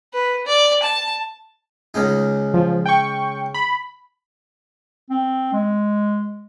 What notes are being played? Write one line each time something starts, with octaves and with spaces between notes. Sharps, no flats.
B4
D5
A5
C#2 C#3 D#4
F3
G5 C#6
B5
C4
G#3